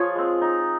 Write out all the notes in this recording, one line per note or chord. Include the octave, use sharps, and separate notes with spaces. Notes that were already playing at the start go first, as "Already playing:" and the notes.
Already playing: F3 F4 G#4 C#5
G#3 C4
D#4